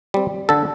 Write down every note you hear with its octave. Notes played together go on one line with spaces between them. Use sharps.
G3 C4
D3 A4